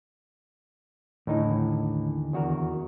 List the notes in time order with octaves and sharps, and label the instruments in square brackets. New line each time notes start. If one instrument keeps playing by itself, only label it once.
[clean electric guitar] D#2 D3 E3 [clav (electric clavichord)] A2 D#4
[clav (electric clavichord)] E2 F#4 A#4